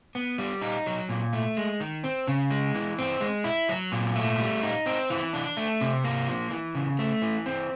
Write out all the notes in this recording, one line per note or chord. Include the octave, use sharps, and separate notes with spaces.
B3
G3
D#4
F#3
A#2
A3
G#3
D#3
C4
C#3
G#3
E3
C4
G#3
E4
F#3
A#2
A3
G3
D#4
C4
E3
D4
A3
C3
A#3
F3
E3
C#3
A3
E3
C4